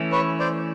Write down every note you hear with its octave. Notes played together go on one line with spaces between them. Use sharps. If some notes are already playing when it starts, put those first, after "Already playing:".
Already playing: E3 A3 C#4 E4
B4 C#5
C5 D5